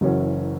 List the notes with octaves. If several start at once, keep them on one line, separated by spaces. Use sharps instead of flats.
F#1 F#2 E3 C#4 F#4